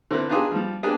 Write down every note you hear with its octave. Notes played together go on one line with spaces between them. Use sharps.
D3 C4 E4 A#4 B4
B3 D4 D#4 F4 G4 G#4
F3 G3
A#3 B3 D4 G4 G#4